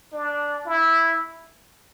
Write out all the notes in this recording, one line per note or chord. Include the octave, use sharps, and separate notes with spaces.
D4
E4